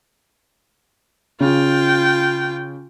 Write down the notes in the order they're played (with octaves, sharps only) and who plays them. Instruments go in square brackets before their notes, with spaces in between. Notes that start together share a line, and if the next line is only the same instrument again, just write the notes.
[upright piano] C#3 [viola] F4 G5